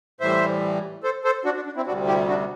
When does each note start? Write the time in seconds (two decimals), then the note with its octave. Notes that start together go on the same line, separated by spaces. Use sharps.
0.20 A2 E3 G3 C5 E5
1.03 A4 C5
1.24 A4 C5
1.45 D4 F#4
1.56 D4
1.66 D4
1.76 C4 E4
1.86 D2 C3 G3 D4 F#4
2.07 E4 G4
2.28 D4 F#4